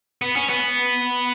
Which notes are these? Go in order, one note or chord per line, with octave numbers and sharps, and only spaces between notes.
B3
C#4
B3